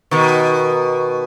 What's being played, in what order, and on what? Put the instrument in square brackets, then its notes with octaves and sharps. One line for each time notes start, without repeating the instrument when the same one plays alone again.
[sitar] B2 D#3